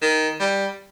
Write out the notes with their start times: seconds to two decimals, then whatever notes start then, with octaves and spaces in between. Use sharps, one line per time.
0.02 D#3
0.40 G3